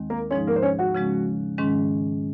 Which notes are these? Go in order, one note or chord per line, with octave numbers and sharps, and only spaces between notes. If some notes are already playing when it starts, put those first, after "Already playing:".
Already playing: D#2 D#3 G#3 C4
A#3 A#4
G#2 F3 G#3 C#4 D#4 C#5
A#3 A#4
C5
C#4 C#5
F#4 F#5
C#3 F3 G#3 C#4
G#2 D#3 G#3 C#4